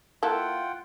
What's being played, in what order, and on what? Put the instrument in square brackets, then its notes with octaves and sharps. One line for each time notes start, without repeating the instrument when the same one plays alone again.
[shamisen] A#3 E4 A4 [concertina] F4 F#5 G5